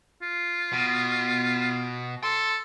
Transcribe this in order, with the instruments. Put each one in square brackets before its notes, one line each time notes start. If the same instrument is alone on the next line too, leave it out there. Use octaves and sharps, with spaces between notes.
[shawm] F4
[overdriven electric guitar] B2
[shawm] A4 [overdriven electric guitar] C6